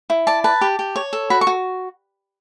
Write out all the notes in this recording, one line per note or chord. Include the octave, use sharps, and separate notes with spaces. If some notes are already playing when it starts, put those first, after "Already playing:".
E4
D5 A5
B4 A5
G4
G4
C#5
A4
F#4 B5
C#6
F#4